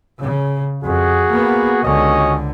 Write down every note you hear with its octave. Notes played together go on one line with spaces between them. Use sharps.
C#3
F2 F#4 G#4
A#3 B3
C#2 D3 C#4 F#4 D#5